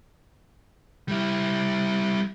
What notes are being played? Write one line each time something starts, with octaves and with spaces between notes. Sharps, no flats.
G3 E4